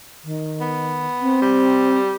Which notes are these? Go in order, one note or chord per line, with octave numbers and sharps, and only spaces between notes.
D#3
B3
C4
G3